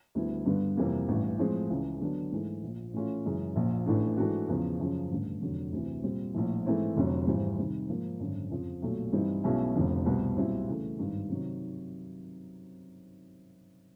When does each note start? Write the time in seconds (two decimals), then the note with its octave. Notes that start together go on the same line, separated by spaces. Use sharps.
0.15 D2 D3 G3 B3 E4
0.46 G2 D3 G3 B3
0.77 F2 C3 E3 G3 A#3
1.08 A1 G2 E3
1.39 A2 F3 G#3 C4
1.69 C#2 C#3 E3
2.01 D3 F#3 B3 D4
2.32 G#2 E3 A3
2.63 A#1 A#2 F3
2.94 A2 E3 A3 C#4 F4
3.25 F#2 C#3 E3 G#3
3.56 A#1 A#2 F3
3.86 A1 A2 E3 A3 D4
4.17 G#2 E3 A3 D4 F#4
4.48 E2 C#3 F3
4.79 F#2 C#3 F3
5.10 A1 G2 D3
5.42 F1 F2 D3 F#3
5.72 D2 C3 E3
6.03 A#2 G3 C4
6.34 A#1 A2 F3
6.65 G#2 E3 A3 C4 E4
6.96 F1 F2 D3 F#3
7.27 G#1 G#2 E3 G3 C4
7.58 C3 D#3 G3
7.89 G#2 F3 A#3
8.20 G#1 F#2 D3
8.51 F2 C#3 F3
8.82 B1 A#2 F#3 A3
9.12 G2 E3 G3 C4 D#4
9.43 B1 B2 G#3 C#4 E4
9.75 F1 F2 D3 F3
10.06 C2 B2 G3 C4
10.36 B1 A#2 G3 C4 E4
10.67 C#3 E3 A3
10.98 G#1 G2 D#3
11.29 C3 D#3 F#3